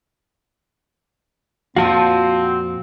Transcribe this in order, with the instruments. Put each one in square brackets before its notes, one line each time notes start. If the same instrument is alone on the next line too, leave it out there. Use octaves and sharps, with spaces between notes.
[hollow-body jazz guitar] F2 A#2 [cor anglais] C4 [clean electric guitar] F#4 [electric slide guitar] F5 A5